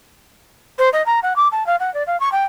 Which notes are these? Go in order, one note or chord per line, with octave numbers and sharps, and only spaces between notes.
C5
D#5
A#5
F#5
D6
A5
F5
F#5
D5
F5
C#6
G5